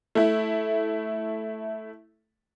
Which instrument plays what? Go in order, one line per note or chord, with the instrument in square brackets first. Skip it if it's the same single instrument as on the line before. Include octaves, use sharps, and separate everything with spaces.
[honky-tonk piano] A3 E4